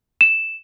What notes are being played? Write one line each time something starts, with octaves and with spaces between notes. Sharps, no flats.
E7